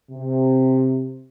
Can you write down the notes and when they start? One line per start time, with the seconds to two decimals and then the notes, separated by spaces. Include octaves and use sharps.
0.11 C3